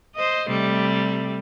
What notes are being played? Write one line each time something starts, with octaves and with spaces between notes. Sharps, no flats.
C5 D#5
C3 G3 A3